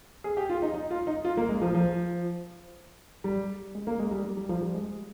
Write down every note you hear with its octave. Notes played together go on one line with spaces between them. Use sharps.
G#4
G4
F4
D#4
D#4
F4
D#4
F4
A#3
G#3
F3
F3
G3
G#3
A#3
G#3
G3
G3
G3
F3
G3
G#3